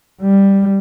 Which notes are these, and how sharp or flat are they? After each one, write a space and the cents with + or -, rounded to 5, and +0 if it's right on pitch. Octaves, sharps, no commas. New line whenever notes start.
G3 +5